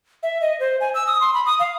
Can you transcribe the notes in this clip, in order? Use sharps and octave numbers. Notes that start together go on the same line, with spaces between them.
E5
D#5
C5
G#5
E6
D#6
C6
B5
D#6
F5